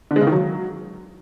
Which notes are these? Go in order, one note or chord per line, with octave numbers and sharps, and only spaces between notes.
D3
G#3
C#3
D#3
F#3